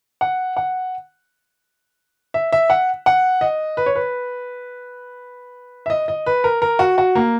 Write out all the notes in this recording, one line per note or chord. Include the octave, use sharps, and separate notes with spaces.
F#5
F#5
E5
E5
F#5
F#5
D#5
B4
C#5
B4
E5
D#5
D#5
B4
A#4
A#4
F#4
F#4
A#3